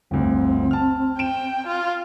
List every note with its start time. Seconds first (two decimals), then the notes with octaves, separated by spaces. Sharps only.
0.11 G1 D2 C4
0.71 A5 F6
1.19 G5 D7 E7
1.67 F4